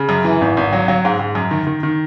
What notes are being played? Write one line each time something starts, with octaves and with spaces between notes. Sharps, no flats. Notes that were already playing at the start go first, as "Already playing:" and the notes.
Already playing: C#3
F#2
E3
G#1
G#1
F#3
F#3
G#2
G#2
F#2
D#3
D#3
D#3